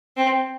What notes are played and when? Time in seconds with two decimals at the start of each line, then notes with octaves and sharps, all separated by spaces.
0.17 C4